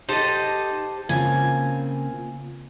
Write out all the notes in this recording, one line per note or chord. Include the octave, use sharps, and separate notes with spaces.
D#4 G4 A4 C5 D#5 A5
C#3 A#3 C4 F4 G#5